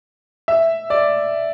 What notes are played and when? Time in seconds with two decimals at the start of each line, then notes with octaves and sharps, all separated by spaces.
0.48 E5
0.90 D5